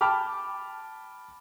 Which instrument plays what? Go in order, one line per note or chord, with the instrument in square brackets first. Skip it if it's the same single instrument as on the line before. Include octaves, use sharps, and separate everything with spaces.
[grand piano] G5 A5 B5 D6 F6